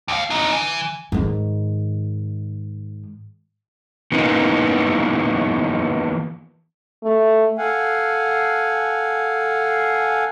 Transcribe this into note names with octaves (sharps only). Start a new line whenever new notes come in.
D#2 F5
D4 D#4
E3
G#2 D#3
E3 A#3 B3 D#4 F4
A3
A4 F5 F#5 G#5